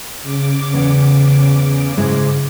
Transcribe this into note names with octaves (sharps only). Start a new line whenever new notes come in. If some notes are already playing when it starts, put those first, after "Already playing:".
C#3 D6
E2 C#4 F#5
G#2 G#3 E4